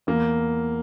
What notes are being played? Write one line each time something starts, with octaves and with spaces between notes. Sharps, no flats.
E2 A#3